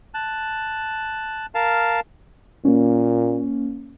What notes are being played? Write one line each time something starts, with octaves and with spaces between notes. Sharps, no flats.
A5 F#6
A#4 F5 A5
A#2 A#3 C#4